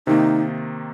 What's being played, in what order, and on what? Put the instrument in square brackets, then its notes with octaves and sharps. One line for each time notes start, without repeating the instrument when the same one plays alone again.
[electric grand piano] C3 D#3 A#3 [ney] D#4